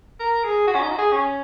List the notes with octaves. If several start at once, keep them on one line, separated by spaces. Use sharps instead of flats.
A#4
G#4
F#4
C#4
D#4
F#4
G#4
C#4